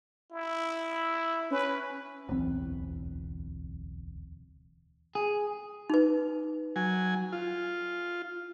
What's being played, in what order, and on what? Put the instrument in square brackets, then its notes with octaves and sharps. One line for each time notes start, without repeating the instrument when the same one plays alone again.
[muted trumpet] E4
[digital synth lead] C#4 [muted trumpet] B4
[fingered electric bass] D1 B1 E2 C4
[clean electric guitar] G#4
[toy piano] D#4 B4
[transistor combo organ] F#3 G#5
F4